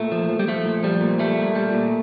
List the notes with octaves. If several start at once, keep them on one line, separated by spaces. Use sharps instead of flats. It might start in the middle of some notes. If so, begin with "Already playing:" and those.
Already playing: A#2 A3
F3
F3
G3
F3 A3
A#2
F3 G3
A#2
G3 A3
A#2
G3
A#2